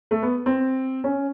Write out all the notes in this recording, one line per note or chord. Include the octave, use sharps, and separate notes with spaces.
A3
B3
C4
C#4